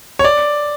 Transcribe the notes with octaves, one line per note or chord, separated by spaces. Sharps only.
C#5
D5